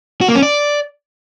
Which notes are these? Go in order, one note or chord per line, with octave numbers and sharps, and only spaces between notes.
F#4
A#3
C#4
D5